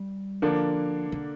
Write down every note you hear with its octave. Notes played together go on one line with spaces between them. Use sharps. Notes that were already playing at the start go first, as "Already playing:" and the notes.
Already playing: G3
D3 F3 A#3 D4
D3